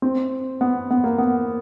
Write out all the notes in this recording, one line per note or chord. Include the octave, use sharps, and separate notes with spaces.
C4
B3
B3
A#3
B3